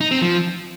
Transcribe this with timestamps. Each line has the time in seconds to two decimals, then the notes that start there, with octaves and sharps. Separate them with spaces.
0.01 D#4
0.11 C4
0.22 F3